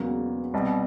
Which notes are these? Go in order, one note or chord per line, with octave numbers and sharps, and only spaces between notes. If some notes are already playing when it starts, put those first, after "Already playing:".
Already playing: E1 E2 C#3 F#3 A#3
C2 B2 G3